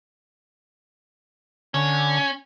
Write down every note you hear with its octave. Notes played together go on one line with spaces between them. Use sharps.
D3 C#4